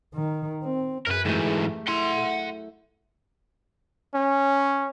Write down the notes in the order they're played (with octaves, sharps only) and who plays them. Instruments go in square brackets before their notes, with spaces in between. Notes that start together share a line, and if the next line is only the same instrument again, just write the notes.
[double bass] D#3
C4
[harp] F#2 G#4 [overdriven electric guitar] A#4 B4
[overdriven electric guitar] G#2 E3 [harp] A3 G4
[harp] E4 [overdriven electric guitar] F#5 C6
[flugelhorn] C#4